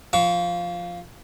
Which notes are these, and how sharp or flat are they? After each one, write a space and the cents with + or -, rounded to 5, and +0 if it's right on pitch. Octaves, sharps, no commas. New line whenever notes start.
F3 +0 C#6 +40